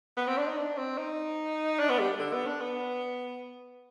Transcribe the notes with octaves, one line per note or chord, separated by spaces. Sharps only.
B3
C4
D4
D#4
D4
C4
D#4
D4
B3
G3
D3
B3
D4
B3